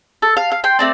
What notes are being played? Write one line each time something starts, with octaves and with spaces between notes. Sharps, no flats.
A4
F5
F5
G5 C6
A3 C4 D5